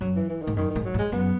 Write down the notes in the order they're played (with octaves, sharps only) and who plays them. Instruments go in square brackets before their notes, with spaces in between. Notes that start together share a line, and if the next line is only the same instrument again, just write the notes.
[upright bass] F#2 [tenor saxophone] F#3
[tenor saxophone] E3
E3
D#3
[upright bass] G#2
[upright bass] F#2 [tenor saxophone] D#3
[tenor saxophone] D#3
[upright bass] G#2
[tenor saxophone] F#3
[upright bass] G#2
[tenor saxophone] G#3
[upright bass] F#2 [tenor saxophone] B3